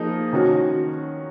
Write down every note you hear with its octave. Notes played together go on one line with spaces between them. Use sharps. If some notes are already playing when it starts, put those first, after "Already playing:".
Already playing: F3 A#3 D#4 G#4
D#3 F#3 C#4 F#4